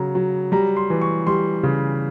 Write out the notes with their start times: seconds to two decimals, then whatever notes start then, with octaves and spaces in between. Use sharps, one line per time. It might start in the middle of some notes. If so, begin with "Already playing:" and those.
Already playing: C#3 F#3 A#5
0.15 F#3
0.52 G3 A#5
0.76 C6
0.90 E3
1.01 C#6
1.27 G3 C6
1.63 C#3